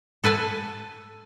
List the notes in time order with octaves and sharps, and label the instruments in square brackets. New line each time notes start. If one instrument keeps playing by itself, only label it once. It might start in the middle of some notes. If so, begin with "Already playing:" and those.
[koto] A4 B4 G#5 A5